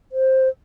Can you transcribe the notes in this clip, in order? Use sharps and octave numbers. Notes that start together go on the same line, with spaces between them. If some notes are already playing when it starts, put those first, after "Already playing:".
C5